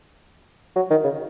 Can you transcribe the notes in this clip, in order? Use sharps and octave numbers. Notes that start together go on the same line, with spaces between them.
F#3
D#3
C#3